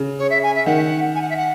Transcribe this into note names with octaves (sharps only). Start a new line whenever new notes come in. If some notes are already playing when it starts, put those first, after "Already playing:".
Already playing: C#3
C#5
E5
G#5
E5
D#3 F#5
G#5
F#5
E5
F#5